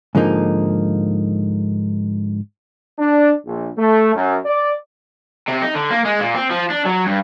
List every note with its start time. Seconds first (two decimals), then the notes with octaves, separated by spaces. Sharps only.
0.15 G#2 D3 F3 A#3 D#4
2.99 D4
3.45 A#1
3.76 A3
4.15 F#2
4.45 D5
5.48 C3
5.62 D#4
5.75 D3
5.91 A#3
6.05 G#3
6.20 A#2
6.35 C4
6.51 F3
6.70 D4
6.86 F#3
7.06 G2